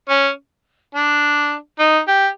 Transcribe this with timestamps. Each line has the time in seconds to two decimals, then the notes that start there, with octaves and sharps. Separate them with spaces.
0.09 C#4
0.95 D4
1.79 D#4
2.08 G4